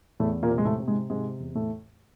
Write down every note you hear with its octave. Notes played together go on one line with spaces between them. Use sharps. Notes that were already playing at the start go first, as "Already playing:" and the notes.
E2 A2 A3
A#2 A#3
C3
G#3
A2 A3
C3
G#2 G#3
G#2 C3 G#3
E2
A2 A3